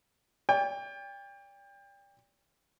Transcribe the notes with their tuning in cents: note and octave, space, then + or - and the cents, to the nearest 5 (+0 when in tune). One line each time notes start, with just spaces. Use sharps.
D5 -40 G5 +30